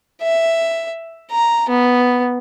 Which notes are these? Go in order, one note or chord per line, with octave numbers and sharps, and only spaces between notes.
E5
A#5
B3